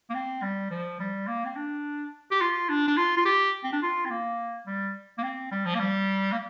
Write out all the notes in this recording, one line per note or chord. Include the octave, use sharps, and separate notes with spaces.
A#3
C4
G3
F3
G3
A#3
C4
D4
G4
F4
D4
D4
F4
F4
G4
C4
D4
F4
C4
A#3
G3
A#3
C4
G3
F3
A#3
G3
A#3